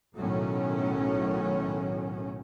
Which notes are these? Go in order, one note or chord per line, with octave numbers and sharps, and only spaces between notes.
B1 A2 D#3 F#3 C#4